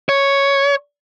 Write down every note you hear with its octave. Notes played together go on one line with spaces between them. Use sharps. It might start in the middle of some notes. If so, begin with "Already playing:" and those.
C#5